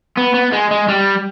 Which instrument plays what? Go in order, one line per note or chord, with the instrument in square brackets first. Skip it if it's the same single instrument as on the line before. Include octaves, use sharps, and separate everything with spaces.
[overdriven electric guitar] B3
B3
G#3
G#3
G3